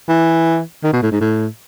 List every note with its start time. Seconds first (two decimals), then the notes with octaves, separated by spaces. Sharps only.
0.08 E3
0.84 D#3
0.93 B2
1.02 A2
1.12 G#2
1.21 A2